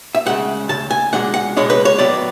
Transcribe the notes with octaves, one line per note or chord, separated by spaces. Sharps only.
E5
D2 C#3 E3 G#3 F#5
D2 C#3 A5
G#5
C#2 B2 G#3 D4 F#5
F#5
C#2 B2 G#3 D4 C#5
B4
C#5
B1 A2 F#3 B3 D5